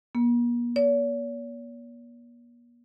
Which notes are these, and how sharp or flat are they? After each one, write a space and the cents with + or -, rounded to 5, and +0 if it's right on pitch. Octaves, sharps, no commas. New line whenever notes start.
A#3 +45
C#5 +45